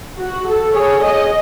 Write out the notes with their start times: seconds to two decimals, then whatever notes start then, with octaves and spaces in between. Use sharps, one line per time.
0.18 F#4
0.47 A4
0.75 G#4 C#5
1.03 G#4 D#5